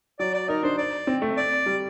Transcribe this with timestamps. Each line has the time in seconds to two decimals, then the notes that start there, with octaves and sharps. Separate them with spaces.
0.19 F#3 D5
0.34 D5
0.48 D#4 A#4
0.63 D4 C5
0.78 D5
1.07 C4
1.22 A3
1.37 D5
1.66 G3